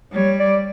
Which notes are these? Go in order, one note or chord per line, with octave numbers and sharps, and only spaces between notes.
G3 C#5
D5